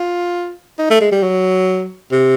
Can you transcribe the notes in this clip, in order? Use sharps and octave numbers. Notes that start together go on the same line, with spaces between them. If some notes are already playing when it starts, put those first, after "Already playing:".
Already playing: F4
D#4
A3
G#3
G3
F#3
C3